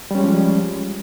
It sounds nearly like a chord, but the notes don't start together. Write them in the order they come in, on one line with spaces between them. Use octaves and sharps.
G3 C#4 G#3 F3